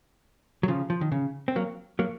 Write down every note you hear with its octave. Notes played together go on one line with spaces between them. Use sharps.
F#3
C#3 F3
F3
D#3
C#3
C4
F#3 A#3
F#3 A#3